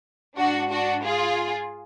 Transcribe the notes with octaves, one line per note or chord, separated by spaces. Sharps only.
G#2 D4 F#4
D4 F#4
F4 G#4